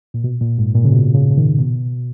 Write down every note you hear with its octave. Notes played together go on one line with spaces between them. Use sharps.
A#2
B2
A#2
G#2
A#2
C#3
B2
C#3
C#3
D#3
B2